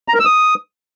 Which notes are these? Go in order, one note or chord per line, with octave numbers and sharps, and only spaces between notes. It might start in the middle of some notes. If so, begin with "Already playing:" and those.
A#5
A#4
E6
D#6